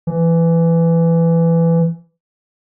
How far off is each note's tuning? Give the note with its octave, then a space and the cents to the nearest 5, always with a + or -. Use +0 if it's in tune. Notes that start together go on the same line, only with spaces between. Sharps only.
E3 +15